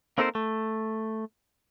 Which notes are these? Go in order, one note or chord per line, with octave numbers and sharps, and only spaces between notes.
A#3 C4 D#4 A4 A#4 C5
A3